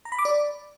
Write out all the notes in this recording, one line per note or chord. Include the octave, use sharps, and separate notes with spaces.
A#5
B5
D6
D5